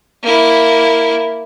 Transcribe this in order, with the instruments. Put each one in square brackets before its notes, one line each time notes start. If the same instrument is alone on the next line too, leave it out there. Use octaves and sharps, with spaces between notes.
[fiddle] A#3 E4